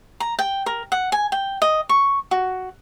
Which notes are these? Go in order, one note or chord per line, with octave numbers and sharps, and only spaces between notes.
A#5
G5
A#4
F#5
G#5
G5
D#5
C#6
F#4